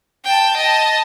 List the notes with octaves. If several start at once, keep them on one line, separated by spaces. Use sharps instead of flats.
G5 A5
D#5 A5